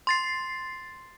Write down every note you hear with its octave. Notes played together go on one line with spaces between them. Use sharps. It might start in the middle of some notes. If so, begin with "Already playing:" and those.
C6 A6 C7